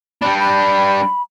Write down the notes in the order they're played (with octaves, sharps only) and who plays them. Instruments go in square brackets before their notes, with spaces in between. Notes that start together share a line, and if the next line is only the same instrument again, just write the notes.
[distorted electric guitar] G3 D4 [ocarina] B5
[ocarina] B5